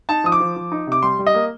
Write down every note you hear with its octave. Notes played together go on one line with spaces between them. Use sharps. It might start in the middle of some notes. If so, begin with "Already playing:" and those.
D#4 A5
F3 D#6
D6
F3
F3
D#4
C3 D6
G3 C6
G3
D#5
A#3